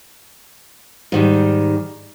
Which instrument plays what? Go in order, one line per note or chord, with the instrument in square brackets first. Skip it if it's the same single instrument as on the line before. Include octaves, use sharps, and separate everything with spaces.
[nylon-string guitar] G#2 D#3 G3